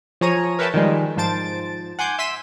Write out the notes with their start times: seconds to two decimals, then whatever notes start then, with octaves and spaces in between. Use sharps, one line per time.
0.21 F3 G#4 C#5 A#5 D#7
0.59 A#4 B4 C#5 E5 G5 A5
0.74 D#3 F3 G3 G#3
1.17 G#2 F3 C5 A5 A6 D7
1.99 F#5 G#5 C6 D6 G6
2.18 E5 C6 E6 B6 D#7 E7